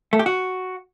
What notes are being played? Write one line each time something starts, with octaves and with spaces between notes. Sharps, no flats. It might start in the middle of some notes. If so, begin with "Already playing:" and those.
A3
G4
F#4